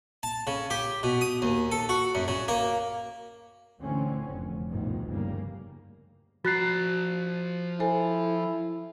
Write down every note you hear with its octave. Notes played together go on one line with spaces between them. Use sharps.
A5
C#3
G4
B2
D#6
D#2
A4
F#4
F#2
C#3
A#3
D2 A#2 D3 E3 C4 C#4
F1
G1 D2 G2 B2 D#3 F3
C#3 G3 A#3
F3 F#4 A#5 F#6 A6 C7
E4 A4 C5 G#5